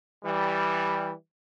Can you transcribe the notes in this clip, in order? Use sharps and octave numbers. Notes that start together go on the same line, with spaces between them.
E3 G3